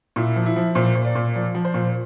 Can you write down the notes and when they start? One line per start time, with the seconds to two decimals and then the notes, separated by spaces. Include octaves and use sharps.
0.16 A#2 E4
0.36 F3
0.46 E4
0.56 F3
0.75 A#2 C5
0.95 A#2
1.05 D5
1.15 A#2
1.36 F3 D5
1.55 F3
1.65 C5
1.74 A#2